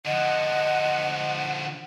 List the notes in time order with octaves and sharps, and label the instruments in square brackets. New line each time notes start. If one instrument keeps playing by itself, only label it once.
[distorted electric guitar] D3 F3 [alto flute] D#5 [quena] F#5